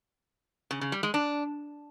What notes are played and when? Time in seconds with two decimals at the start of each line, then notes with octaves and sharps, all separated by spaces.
0.71 C#3
0.81 C#3
0.92 G3
1.03 G#3
1.14 D4